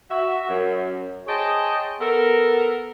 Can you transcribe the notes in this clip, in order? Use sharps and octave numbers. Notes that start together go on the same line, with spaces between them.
F#4 E5
F#2
G#4 C5 C#5 D#5 G5 A5
B3 A4 A#4